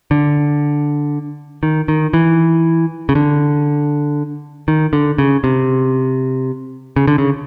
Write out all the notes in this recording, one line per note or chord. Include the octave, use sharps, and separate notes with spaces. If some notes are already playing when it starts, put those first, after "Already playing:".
D3
D#3
D#3
E3
C#3
D3
D#3
D3
C#3
C3
C#3
D3
C#3